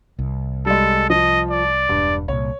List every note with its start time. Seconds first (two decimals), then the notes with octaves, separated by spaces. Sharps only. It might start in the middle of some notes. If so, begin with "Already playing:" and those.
0.19 C2
0.66 G3 G#3 A4
1.10 F3 D#5
1.50 D5
1.89 E1 G2
2.28 C2 A#2 C#5